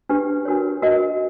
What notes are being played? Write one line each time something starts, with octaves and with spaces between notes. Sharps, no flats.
D4 G4 B4
D4 F#4 A#4 C#5
F#4 A#4 D#5